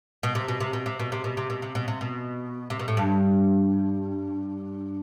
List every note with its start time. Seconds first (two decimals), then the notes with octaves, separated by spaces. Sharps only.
0.23 B2
0.35 C3
0.48 B2
0.60 C3
0.73 B2
0.86 C3
1.00 B2
1.12 C3
1.24 B2
1.37 C3
1.50 B2
1.62 C3
1.75 B2
1.88 C3
2.01 B2
2.70 C3
2.80 B2
2.88 A2
2.97 G2